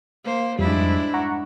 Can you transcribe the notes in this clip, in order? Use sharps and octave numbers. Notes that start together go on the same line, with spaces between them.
A#3 C5
F2 G#2 F3 G3 D4 E4
F#5 A#5 C#6